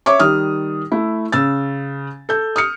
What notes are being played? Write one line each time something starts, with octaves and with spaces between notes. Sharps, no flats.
C#5 E5 C#6 D6
D#3 G3 D#6 F6
A3 E4
C#3 E6 A6
A4 G6
D#6 F6 C#7